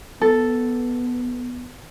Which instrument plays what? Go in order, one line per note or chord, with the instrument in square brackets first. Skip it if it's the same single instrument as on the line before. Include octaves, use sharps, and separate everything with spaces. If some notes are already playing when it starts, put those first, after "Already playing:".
[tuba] B3 [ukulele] A4